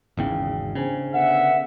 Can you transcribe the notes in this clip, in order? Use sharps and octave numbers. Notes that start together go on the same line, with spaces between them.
G#1 E2 C#3 E4 G5
C#3 D4 C5 G#5
D3 B3 E5 F#5